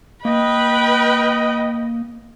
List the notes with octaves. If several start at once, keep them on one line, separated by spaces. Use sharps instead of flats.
A#3 B4 D#5 G5